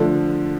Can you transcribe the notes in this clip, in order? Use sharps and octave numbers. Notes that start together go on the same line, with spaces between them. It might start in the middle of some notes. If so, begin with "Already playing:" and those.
Already playing: D3 F3 A3 D4